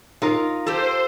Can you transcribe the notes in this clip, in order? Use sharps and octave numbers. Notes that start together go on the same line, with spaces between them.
D#4 F4 A#4 F5
G4 A4 C5